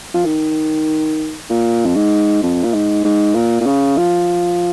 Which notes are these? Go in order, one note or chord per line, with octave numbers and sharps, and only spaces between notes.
F3
D#3
A#2
F2
G#2
F2
A#2
G#2
G#2
A#2
A#2
C#3
F3